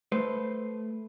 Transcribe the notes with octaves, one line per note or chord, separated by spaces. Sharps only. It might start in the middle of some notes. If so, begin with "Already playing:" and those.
A3 B4 C5